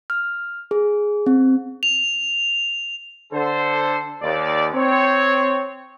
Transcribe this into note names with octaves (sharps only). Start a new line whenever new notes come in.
F6
G#4
C4
F7
D3 A4 C5
D#2 D5
C4 C#5